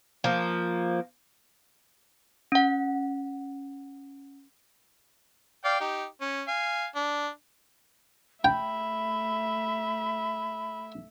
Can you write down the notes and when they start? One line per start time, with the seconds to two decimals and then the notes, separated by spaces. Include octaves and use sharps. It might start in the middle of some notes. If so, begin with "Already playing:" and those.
0.24 F3 A#3
2.52 C#4 F#5
5.65 D5 F5 G5
5.80 D#4 G4
6.21 C#4
6.48 F5 G#5
6.96 D4
8.44 A3 E5 G5 B5